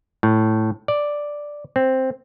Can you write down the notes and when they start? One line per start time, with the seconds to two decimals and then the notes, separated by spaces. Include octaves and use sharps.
0.23 A2
0.88 D5
1.76 C4